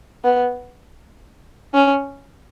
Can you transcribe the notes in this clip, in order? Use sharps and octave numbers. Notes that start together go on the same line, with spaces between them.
B3
C#4